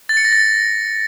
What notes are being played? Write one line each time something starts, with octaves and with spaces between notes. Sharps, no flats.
A6
C#7
A#6
A6